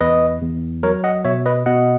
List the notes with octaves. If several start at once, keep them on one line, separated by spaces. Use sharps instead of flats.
E2 B4 D#5
E2
F#3 A#4 C#5
D#5 F#5
B2 C#5 E5
B4 D#5
B2 D#5 F#5